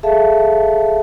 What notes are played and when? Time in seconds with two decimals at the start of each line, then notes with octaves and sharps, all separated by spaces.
0.03 G#4 A4 E5 F5 A5